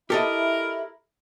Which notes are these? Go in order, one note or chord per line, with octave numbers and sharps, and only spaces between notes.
E4 G4 A4 A#4 D#5